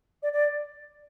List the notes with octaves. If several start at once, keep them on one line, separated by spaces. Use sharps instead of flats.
D5
D5